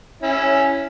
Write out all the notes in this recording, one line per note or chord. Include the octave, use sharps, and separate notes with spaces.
C#4 E4